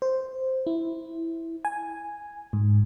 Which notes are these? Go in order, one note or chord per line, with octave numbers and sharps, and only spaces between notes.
C5
E4
G#5
G#2